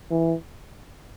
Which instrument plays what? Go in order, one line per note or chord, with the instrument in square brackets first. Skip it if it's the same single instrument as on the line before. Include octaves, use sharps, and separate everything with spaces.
[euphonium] E3